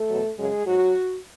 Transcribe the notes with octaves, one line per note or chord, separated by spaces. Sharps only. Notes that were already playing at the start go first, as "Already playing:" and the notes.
Already playing: A3 A4
E2 B2 F#3
F#2 C#3 F#3 G#3 G#4
G#2 F#3 F#4